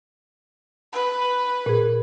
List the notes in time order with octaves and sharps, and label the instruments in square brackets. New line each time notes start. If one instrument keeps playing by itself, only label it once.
[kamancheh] B4
[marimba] A#2 G#4